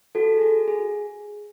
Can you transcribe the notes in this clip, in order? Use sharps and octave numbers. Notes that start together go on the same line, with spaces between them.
F#4 A4
G#4
F#4
G#4